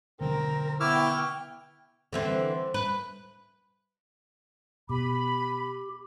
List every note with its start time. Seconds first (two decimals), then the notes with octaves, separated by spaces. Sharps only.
0.21 B2 D3 F#3 C4 A#4
0.80 B3 E4 G5 C#6 D6 E6 F6
2.13 D3 E3 C4
2.74 B4
4.89 B2 G4 B5